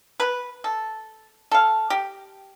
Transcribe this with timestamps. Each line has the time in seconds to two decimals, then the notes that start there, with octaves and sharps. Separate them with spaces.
0.20 B4
0.64 A4
1.51 A4 F5
1.90 G4